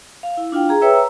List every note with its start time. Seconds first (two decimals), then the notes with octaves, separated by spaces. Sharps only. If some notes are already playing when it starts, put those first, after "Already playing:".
0.23 F5
0.37 E4
0.52 D4 F4 F5 G5
0.69 G#4 A#5
0.81 B4 C#5 E5 G5 E6
0.93 A#5